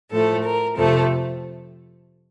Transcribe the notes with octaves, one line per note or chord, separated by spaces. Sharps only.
A2 F3 A3 A4
A#4
F2 C3 F3 A3 A4